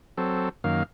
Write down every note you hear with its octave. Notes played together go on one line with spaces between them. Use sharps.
F#3 C4 A4
F#2 D#3 A#3 F5